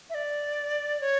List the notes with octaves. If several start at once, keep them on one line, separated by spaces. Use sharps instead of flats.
E5
D5
C#5